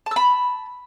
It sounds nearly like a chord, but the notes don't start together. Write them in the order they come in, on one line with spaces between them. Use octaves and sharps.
A5 E6 B5